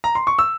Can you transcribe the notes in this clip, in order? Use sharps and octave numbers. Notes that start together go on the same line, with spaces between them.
A#5
C6
C#6
E6